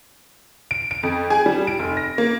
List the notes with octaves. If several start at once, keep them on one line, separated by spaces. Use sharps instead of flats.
D7
D7
F2
G#4
G3
D7
F1
A#6
A#3